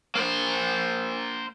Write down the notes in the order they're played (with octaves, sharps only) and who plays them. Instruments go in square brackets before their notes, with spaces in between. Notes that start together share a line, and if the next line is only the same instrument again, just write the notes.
[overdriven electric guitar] A#3 C5